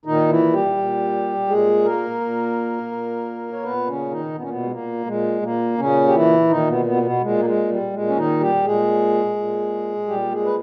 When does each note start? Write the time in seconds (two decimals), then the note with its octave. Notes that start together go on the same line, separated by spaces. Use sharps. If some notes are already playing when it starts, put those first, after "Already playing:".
0.05 A#2 D#3 D#4
0.29 E3 E4
0.53 G3 G4
0.77 A#2
1.48 A#2 G#3 G#4
1.85 A#3 A#4
2.21 A#2
2.91 A#2
3.53 C#5
3.63 A#2 B3 B4
3.88 C#3 C#4
4.11 D#3 D#4
4.35 A#2 B3
4.42 C#4
4.49 B2 B3
4.63 G#3
4.71 A#2 A#3
5.06 A#2 G#3
5.42 A#2 A#3
5.78 A#2 C#3 C#4
6.08 G4
6.14 E3 E4
6.50 A#2 D#3 D#4
6.67 B2 B3
6.85 B2 B3
7.03 B2 B3
7.21 A#2 G#3
7.38 A#3
7.45 G#3
7.70 G3
7.94 A#2 G#3
8.08 C#4
8.16 D#3 D#4
8.40 G3 G4
8.65 A#2 G#3 G#4
9.36 A#2
10.08 A#2 G3 G4
10.31 G#3 G#4
10.45 B4